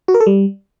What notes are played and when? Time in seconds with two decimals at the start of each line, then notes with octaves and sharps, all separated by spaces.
0.08 F#4
0.14 A#4
0.20 A4
0.26 G3